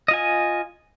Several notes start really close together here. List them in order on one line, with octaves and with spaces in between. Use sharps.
D#5 F4 G#5